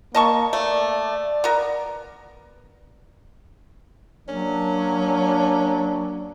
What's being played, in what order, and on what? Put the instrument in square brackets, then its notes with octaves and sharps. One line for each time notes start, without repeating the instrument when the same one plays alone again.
[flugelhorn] A#3 [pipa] D#5 A5 C#6
[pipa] A3 [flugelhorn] D5
[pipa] B3 A#4
[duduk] F#3 [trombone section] A#3 D4 [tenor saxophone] C#4